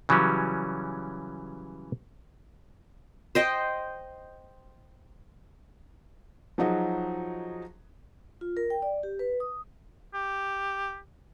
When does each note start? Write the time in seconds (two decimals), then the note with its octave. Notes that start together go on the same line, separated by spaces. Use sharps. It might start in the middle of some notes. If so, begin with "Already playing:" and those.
0.09 C#3 E3 F#3 G3 C#4
3.35 C5 D#5 G5
6.58 F3 F#3 D#4 F#4 G#4
8.41 F4
8.57 A#4
8.70 G5
8.82 D5
9.03 G4
9.19 B4
9.40 D#6
10.14 G4